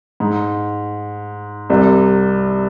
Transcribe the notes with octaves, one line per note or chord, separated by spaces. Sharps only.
G#2
C2 C3